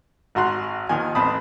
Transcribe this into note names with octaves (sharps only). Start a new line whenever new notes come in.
G#1 F#4 A#5 C6 F#6
D#2 D#3 F3 G#5
A1 C4 A5 B5 D#6